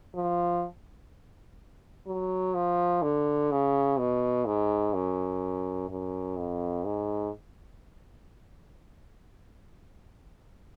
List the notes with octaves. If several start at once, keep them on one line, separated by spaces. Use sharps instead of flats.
F3
F#3
F3
D3
C#3
B2
G#2
F#2
F#2
F2
G#2